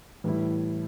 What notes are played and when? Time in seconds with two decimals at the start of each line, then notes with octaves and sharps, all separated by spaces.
0.24 A2 E3 G3 E4